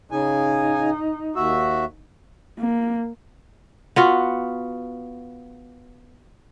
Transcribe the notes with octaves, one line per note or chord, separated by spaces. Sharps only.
C#3 D#4 G#5
D#2 F#4 E5
A#3
B3 F4 F#4